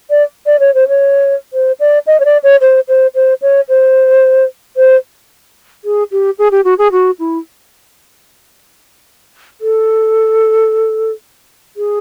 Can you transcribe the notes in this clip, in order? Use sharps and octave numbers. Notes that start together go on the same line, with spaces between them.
D5
D5
C#5
C5
C#5
C5
D5
D#5
C#5
D5
C#5
C5
C5
C5
C#5
C5
C5
G#4
G4
G#4
G4
F#4
G#4
F#4
E4
A4
G#4